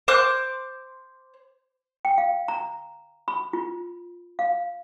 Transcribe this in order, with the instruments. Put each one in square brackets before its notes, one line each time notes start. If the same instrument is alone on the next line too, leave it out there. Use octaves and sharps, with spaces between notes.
[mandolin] C5 D6 F#6
[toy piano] G5
F5
A#5
B5
F4
F5